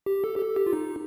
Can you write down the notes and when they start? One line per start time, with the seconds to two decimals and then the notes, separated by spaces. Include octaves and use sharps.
0.06 G4
0.24 A4
0.36 G4
0.39 A4
0.56 G4
0.66 F4
0.73 D#4